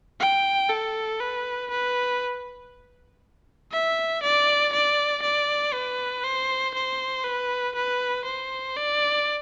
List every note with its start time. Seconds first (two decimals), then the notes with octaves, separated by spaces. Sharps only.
0.20 G5
0.70 A4
1.20 B4
1.71 B4
3.72 E5
4.23 D5
4.73 D5
5.23 D5
5.74 B4
6.24 C5
6.74 C5
7.24 B4
7.75 B4
8.25 C5
8.76 D5